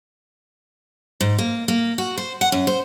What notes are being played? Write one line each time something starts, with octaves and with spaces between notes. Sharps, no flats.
G#2
A#3
A#3
F#4
C5
F#5
F#2
C5